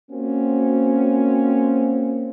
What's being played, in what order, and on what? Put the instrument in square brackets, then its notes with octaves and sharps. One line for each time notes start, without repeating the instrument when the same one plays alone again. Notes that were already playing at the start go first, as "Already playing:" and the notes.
[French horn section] A#3 C4 C#4 F#4